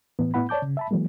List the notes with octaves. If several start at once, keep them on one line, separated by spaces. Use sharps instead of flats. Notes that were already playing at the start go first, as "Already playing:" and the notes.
A2 E3 B3
A2 B3 E4 F#5 B5
C#5 D5 A5 D6 G6
C#3
E5 A5 B5
E3 F#3 G#3 A#3